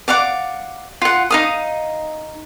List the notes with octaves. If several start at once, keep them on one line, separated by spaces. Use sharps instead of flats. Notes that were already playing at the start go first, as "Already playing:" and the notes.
D5 F5 F#5 D6
F4 F#5
D#4 F5 D#6